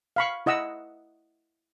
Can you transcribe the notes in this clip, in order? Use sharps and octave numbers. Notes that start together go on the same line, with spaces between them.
F5 B5 C#6
E4 D#5 F#5 E6